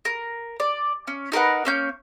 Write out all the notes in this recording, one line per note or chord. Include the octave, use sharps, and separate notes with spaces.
A#4
D5
C#4
D#4 A#4 B4 F#5
A#3 C#4 G6